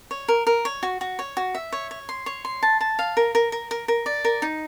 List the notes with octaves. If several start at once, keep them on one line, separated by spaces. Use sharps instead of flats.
C#5
A#4
A#4
C#5
F#4
F#4
C#5
F#4
E5
C#5
C#5
C6
C#5
C6
A5
A5
F5
A#4
A#4
A#4
A#4
A#4
D5
A#4
D#4